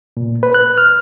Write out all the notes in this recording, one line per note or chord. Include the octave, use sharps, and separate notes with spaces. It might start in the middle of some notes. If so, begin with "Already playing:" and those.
A#2
B4
F#6
F6